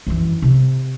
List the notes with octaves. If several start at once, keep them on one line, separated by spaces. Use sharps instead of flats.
F#2 E3
C3